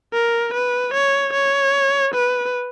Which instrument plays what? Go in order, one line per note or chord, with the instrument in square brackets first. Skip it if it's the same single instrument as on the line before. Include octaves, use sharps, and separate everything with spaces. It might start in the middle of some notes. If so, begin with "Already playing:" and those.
[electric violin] A#4
B4
C#5
C#5
B4